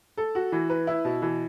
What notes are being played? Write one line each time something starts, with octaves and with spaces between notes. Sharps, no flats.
A4
F#4
E3
B4
E4
B2
E3